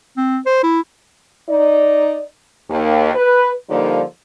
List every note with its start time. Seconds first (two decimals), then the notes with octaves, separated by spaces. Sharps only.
0.17 C4
0.46 C5
0.63 E4
1.49 D#4 D5
2.70 D#2
3.14 B4
3.70 D3 F3 G3 A#3 D#4